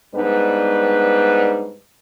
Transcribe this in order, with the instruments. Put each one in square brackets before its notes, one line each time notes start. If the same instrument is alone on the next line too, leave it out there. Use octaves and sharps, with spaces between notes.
[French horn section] G#2 G3 B3 D4 B4